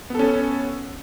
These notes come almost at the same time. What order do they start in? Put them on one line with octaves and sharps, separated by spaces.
B3 A4 C#4